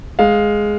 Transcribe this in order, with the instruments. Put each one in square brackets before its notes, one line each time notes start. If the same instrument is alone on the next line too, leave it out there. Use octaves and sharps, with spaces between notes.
[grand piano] G#3 F5